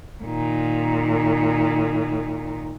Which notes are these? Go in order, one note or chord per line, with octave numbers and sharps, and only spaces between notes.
A#2 D#3